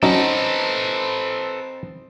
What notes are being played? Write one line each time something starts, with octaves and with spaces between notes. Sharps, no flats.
F#3 C4 C#4 D#4 A4 B4